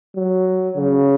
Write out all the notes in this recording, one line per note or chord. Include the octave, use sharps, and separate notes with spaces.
F#3
C#3